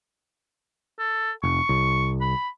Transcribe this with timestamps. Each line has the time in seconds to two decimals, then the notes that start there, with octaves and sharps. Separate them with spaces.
0.99 A4
1.43 F1 C#6
1.69 C2
2.21 B5